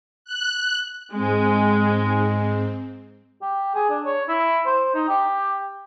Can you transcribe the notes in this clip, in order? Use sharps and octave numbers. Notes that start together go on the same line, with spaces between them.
F#6
G#2 G#3 C4
G4
G#4
D4
C#5
E4
C5
D#4
G4